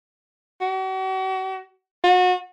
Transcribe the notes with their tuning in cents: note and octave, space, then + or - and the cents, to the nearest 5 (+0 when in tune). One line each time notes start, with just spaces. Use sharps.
F#4 +40
F#4 -30